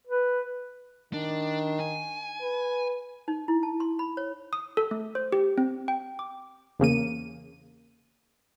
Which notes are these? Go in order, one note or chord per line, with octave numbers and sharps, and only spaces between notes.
B4
D#3 D4
G#5
B4
D#4
E4
A5
C6
B5
C#5
D#6
A4
A3
C5
G4
C4
G5
D6
E2 C#3 A#3 D#7